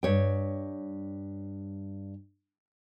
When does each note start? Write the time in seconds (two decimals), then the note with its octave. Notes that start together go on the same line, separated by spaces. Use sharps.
0.03 G2 C#5 G5